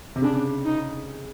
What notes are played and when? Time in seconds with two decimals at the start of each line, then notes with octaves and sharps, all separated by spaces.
0.16 C3
0.22 C#3 D4
0.65 D#4